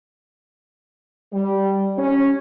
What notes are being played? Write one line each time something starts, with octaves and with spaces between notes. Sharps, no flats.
G3
C#4